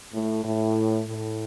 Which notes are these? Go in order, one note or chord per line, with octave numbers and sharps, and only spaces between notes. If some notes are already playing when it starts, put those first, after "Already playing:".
A2
A2
A2